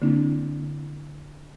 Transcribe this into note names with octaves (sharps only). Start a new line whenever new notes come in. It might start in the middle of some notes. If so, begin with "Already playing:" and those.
D3 A#3 C4 D4 E4